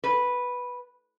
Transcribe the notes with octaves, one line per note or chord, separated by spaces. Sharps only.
B4